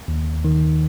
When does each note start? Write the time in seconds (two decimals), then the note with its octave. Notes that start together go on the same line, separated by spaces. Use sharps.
0.08 D#2
0.45 D#3